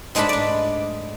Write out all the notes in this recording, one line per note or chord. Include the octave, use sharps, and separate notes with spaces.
G#2 G#3 A3 D4 A5 B5
D4 D5